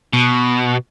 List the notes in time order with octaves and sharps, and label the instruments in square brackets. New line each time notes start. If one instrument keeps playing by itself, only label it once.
[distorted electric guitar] B2